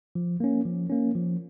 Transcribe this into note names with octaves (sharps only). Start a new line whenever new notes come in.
F3
A#3 C#4
F3
A#3 C#4
F3